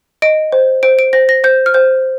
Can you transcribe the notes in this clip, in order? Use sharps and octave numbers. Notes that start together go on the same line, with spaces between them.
D#5 D7
C5
C5 D7
D7
C5 A#6
A#6
C5 G6
F6
C5 G6